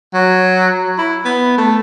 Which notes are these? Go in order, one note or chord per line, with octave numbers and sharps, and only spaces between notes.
F#3
E4
B3
A3